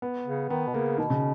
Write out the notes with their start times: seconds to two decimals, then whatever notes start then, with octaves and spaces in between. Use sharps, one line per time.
0.02 B3
0.26 C#3
0.50 D#3 B3
0.67 B2
0.74 C#3 A#3
0.98 B2 D#3
1.10 C#3